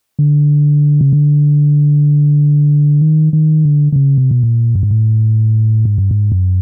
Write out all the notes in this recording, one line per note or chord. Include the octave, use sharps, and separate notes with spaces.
D3
C#3
D3
D#3
D#3
D3
D3
C#3
C3
B2
A#2
G2
G#2
A2
G#2
G2
G#2
F#2